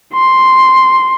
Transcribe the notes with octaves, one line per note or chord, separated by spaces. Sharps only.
C6